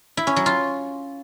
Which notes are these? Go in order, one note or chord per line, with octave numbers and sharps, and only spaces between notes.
E4
C#4
F#3
F4